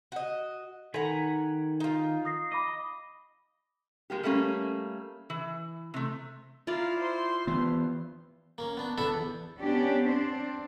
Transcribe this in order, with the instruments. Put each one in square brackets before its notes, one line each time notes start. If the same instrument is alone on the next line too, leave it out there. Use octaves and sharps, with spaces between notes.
[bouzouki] F#4 D#5
[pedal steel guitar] D#3 G#5 B5 [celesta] A4 [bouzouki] F#5 A#5
[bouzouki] D#4 F4
[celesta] D#6 A#6 C7
[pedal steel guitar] D#5 [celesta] B5 D6 D#7
[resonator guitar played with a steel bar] G#3 A#3 G4
G3 A3 A#3 C#4
E3
C3 A3
[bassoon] E4 [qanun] F4 D5 [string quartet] F5 A#5
[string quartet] C5 C6
[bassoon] G2 [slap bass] E3 B3
[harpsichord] A#3 C#4
B3 D4
B3 D4 E4 A4 E5
E2
[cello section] B3 C#4 D4 G4
C4 D4 C5